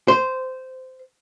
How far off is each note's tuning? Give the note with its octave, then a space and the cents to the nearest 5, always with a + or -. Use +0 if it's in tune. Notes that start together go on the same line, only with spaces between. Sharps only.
C5 -15